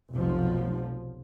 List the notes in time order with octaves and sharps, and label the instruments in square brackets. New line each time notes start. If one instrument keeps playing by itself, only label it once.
[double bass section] F1 B1 F3